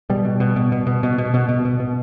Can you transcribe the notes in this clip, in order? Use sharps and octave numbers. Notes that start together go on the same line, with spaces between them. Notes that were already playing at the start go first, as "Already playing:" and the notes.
B2 G3
B2
B2
B2
B2
B2
B2
B2
B2
B2
B2
B2